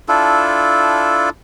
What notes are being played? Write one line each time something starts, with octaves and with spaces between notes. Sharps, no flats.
D4 E4 F4 A4